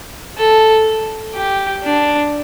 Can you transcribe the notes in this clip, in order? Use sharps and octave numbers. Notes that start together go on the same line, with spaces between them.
A4
G4
D4